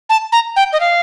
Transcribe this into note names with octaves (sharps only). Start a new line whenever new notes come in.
A5
A#5
G5
D#5
F5